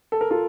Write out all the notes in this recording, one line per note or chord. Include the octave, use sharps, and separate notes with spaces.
A4
A#4
F4 A4